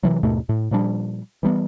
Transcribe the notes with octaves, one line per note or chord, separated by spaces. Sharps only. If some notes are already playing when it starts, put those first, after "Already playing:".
C3 E3 F#3
D#2 G#2 B2 A3
A2
A#2 F3 G3 D4
E3 G3 B3